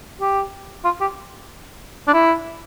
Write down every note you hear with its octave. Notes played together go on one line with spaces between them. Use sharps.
G4
F4
G4
D4
E4